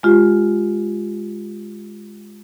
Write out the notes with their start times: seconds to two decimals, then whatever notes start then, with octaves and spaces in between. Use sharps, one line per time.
0.03 G#3 F4 G4